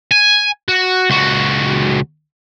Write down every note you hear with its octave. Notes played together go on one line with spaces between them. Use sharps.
G#5
F#4
C#2 F#4